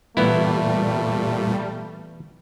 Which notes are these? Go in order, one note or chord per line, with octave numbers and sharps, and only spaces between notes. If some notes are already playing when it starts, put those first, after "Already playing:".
A#2 E3 G3 A3 B3 E4